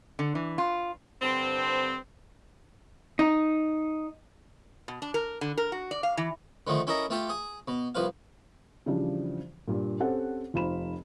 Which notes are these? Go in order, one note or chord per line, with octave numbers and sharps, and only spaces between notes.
D3
E3
F4
G2 D3 C4
D#4
B2
D4
A#4
D3
A#4
F#4
D5
F5
E3
D3 D#3 F3 A3
C#4 E4 A4 A#4 D#5 A#5
A3 F4 G4 A4
G#4
B2
C2 F3 B4 F5
C#3 E3 F3 G3 D4
G2 A#2
C4 C#4 G4 A4 C5 F#5
F1 D#4 F4 C5 B5 E7